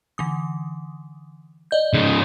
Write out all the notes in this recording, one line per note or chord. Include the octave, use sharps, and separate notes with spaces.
D3 E3 D#6
D5 D#5 G6
G#2 C#3